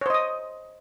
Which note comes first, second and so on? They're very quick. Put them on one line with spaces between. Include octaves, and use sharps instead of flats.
C#5 C5 D#5 D#6